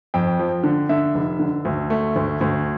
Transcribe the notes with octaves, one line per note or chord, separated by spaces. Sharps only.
F2 G5
F3
D3
D3 E5
F1
D3
D2
A3
D2
D2